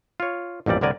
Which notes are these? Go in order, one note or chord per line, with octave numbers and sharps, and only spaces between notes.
F4 C#5
A1 F2 A#2 G3 D5
C2 A2 D3 A#4 D5 G#5